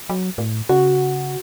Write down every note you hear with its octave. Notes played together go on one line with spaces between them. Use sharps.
F#3
A2
C#3 F#4